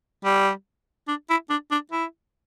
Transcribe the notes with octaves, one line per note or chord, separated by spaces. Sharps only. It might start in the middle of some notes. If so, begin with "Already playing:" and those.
G3
D4
E4
D4
D4
E4